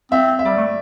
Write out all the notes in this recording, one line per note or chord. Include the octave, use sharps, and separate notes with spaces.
C4 E5
E5
G3 D5
A3